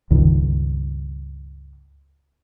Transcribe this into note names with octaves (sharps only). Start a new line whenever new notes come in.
C#2 G2 D#3